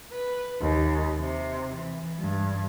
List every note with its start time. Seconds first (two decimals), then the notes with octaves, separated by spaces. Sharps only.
0.11 B4
0.61 D#2
1.19 C3
1.76 E3
2.22 G2